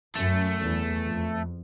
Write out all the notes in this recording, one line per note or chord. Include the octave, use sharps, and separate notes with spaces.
F#2 A3
E2
F2